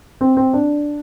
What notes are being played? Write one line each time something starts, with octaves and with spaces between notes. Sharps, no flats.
C4
C4
D4